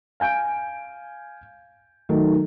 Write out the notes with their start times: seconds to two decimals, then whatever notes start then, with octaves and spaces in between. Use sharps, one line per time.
0.20 F5 G#5 G6 D7
2.09 D#3 F#3 A3